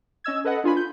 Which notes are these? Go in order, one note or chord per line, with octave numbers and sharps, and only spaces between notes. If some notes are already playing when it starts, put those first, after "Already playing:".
C#4 D#5 E6 G#6
A4 B4 D#5 F#5
D4 F4 G#5 B5
G6